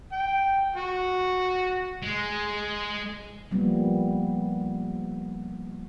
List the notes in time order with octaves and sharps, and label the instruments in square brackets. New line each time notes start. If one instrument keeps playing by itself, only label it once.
[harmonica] G5
F#4
[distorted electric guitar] G#3
[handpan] F3 G3 A#3 B3